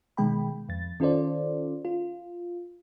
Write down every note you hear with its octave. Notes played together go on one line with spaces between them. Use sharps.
B2 D#3 G#3 G5 B5
F2 A6
D#3 C#4 F4 A4 C5 D5
F4